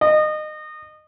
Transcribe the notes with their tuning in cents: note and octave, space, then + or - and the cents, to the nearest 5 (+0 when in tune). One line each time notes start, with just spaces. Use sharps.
D#5 -25